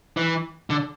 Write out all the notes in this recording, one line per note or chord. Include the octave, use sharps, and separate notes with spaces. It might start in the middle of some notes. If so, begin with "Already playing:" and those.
E3
D3